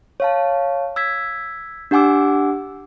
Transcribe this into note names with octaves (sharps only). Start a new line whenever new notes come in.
C#5 F5 A5
E6 G#6 B6
D4 G4 F#5 G#5 D6 E6